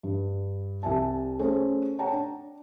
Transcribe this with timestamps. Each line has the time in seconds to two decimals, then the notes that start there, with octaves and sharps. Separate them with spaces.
0.03 G2
0.83 C2 G3 E5 G#5 A5
1.39 A3 C#4 G#4 A4 C5
1.99 C#5 F#5 G5 A5 A#5
2.12 D4